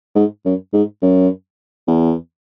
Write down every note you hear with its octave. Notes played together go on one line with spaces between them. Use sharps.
G#2
F#2
G#2
F#2
E2